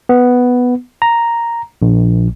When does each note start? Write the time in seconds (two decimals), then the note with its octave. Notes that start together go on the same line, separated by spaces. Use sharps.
0.09 B3
1.02 A#5
1.82 A#1